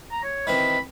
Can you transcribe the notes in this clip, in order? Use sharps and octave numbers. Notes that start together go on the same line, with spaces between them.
A#5
C#5
D#3 E3 C4 B5